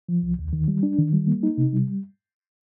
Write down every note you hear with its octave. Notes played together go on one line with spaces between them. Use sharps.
F3
C2
D#2
D#3
G3
D4
D#3
G3
A#3
D#4
C3
G3